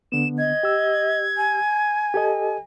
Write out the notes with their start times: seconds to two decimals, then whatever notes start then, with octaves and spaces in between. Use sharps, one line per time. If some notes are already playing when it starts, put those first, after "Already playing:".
0.12 D3 B3 E7
0.38 D#5 G#6
0.63 G4 E6
1.37 G#5
2.14 G4 A4 D#5